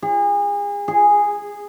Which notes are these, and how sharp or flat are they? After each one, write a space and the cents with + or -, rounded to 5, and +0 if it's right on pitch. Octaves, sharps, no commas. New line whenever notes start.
G#4 -35
G#4 -10